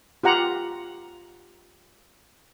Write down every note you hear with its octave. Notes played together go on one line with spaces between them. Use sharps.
F4 G4 F#5 A#5